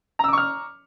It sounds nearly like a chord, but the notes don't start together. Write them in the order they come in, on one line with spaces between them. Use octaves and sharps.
A#5 E6 D6 C#6 F6